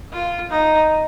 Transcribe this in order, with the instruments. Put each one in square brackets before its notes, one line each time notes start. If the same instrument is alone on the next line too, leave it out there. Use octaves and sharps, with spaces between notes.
[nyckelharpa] F4
D#4